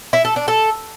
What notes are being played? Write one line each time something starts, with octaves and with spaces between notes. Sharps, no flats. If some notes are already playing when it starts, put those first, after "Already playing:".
E4
A4
D4
A4